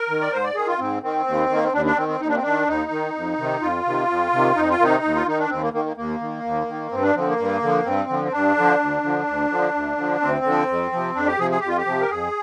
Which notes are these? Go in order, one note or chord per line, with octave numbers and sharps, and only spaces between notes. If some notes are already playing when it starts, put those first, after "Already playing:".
Already playing: A#4
D#3
D5
G#2 C5
D5
D#3 G#4
F4
G#2 C4
D#3 C4
D#2
D#3
A#3
C4
D#2 D4
D4
D#3 C4
C4
D#2 D#4
D4
C4
D#3 D4
D#2 D#4
D#3
F2
C3 D#3
F2 F4
C3 D#3
F2
C3 D#3
F2 D#4
F4
C3 D#3 D#4
D#2
F4
D#3 D#4
D4
D#2 C4
A#3
D#3 A#3
A#3
D#2 A#3
D#3
D#2
D#3
G2 C4
D4
D3 F3 C4
A#3
G2
D3 F3
G2 C4
D3 F3
C4
G2 D4
D3 F3
D2
D3 F3
D2
D3 F3
D2
D3 F3
D2 C4
D3 F3
F2
C3 F3
F2 D4
G4
C3 F3 G#4
G#4
F2 G4
F4
G4
C3 F3
A#4
F2 G#4